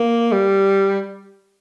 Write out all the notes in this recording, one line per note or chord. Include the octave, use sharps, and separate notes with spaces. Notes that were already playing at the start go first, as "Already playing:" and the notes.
Already playing: A#3
G3